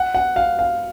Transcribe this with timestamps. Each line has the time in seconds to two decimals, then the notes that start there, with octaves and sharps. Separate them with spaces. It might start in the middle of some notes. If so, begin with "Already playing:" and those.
Already playing: F#5
0.15 F#5
0.36 F5
0.59 F5